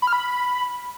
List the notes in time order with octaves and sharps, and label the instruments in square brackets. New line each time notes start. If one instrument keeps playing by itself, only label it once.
[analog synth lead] B5
F6
B5